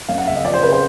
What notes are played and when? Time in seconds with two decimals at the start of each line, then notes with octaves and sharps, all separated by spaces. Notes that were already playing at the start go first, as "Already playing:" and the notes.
0.09 F#2 F5
0.18 F#5
0.27 C#3 E5
0.36 D#5
0.44 F3 D5
0.54 C5
0.63 C#3 B4
0.72 C5